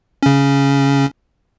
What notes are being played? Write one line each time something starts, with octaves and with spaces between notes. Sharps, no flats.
C#3 C#4